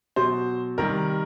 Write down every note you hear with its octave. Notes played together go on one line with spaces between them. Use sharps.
B2 F#3 C5
C3 D#3 G3 A#4